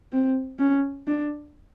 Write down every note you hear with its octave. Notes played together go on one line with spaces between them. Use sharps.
C4
C#4
D4